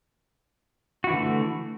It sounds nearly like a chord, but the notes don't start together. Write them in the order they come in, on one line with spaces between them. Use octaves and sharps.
F#4 E4 E3 D3 A3